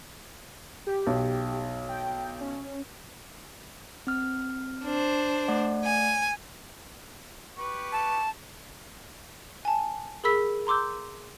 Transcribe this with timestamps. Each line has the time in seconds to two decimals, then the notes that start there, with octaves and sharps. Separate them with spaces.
0.87 G4
1.07 B1
1.89 G5
2.41 C#4
4.07 C4 F6
4.84 D4 C5
5.48 A3 D5 F#5
5.85 G#5
7.58 G4 B4 C#6
7.92 A5
9.65 G#5 A5
10.24 G#4 A#4 B5 E6 B6
10.67 A#5 C6 D6 E6 G6